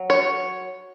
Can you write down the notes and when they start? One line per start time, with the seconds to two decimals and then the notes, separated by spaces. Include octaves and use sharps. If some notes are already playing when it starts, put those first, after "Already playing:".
Already playing: F#3
0.10 C#5